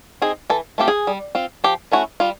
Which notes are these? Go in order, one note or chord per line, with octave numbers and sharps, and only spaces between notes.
C4 D#4 G#4
E3 A4
A3 C4 F4 G4
G#4
G3
C4 F4
F3 G4
A3 C#4 E4 F#4
G3 F4